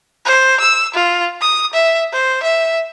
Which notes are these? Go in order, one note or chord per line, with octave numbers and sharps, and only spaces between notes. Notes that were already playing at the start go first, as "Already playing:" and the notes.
C5
E6
F4
D#6
E5
C5
E5